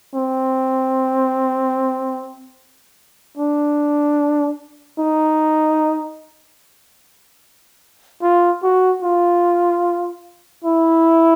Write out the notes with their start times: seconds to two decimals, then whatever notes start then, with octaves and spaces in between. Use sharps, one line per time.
0.14 C4
3.37 D4
4.99 D#4
8.22 F4
8.63 F#4
9.02 F4
10.64 E4